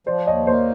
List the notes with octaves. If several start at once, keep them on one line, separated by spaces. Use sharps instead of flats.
F3 C5 D5
D#2 C#5 D#5
A#3 C5 D5